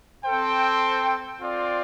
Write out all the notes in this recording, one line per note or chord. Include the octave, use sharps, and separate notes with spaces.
C4 A4 C5 G5
C4 F4 D5